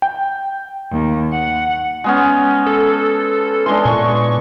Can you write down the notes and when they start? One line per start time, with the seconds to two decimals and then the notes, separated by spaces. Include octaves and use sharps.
0.02 G5
0.92 D#2
1.32 F#5
2.04 G#3 B3 C#4
2.66 A4
3.66 E3 G#3 D4 C6
3.85 A#2 C#6